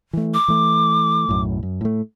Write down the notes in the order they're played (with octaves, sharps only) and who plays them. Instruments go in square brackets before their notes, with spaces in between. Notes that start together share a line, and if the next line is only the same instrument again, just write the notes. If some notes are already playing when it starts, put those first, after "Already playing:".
[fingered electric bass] E3 A3
[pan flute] D6
[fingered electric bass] E3 A3
B1 F#2 A2
F#2
A2 A3